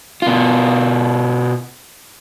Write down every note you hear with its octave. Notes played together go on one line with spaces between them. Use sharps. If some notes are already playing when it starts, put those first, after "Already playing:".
B2 F4